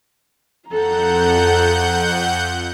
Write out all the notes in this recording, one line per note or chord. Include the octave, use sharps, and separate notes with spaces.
F2 A4 F#5 A#5 G6